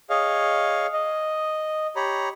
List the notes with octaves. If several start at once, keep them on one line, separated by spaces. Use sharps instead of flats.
G#4 C#5 D#5 F5
D#5
G4 C#5 A#5 B5